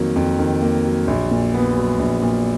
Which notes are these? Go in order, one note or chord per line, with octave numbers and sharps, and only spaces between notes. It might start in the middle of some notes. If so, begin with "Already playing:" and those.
Already playing: F2 D#3 F#3 A#3
F2
D#3
A#3
F#3
A#1
A#2
B3
F#3
A#1
A#2